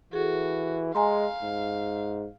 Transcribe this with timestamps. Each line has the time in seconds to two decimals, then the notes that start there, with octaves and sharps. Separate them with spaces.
0.13 E3 F#4 G#4 A4
0.95 G#3 F5 G#5 A#5 C6
1.43 G#2